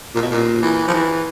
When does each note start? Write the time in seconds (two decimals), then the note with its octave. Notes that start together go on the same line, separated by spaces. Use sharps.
0.15 A#2
0.23 B2
0.31 A#2
0.63 E3
0.88 F3
0.93 E3